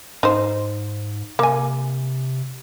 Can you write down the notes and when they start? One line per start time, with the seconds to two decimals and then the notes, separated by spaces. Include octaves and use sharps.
0.23 G#2 D#4 C5
1.39 C3 A#3 G#5